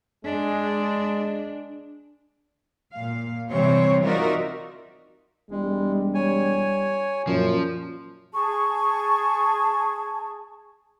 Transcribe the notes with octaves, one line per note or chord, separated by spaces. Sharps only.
G#3 D4
A#2 F5
C3 E3 G3 C4 C5 C#5
D#4 F4 F#4 A#4 D5 E5
E1 G3 G#3
C#5 G#5
F#2 A#2 F3
G#4 A5 C#6